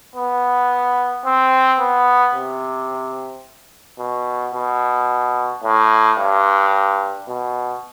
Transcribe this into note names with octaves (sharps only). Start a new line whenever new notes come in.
B3
C4
B3
C3
B2
B2
A2
G2
B2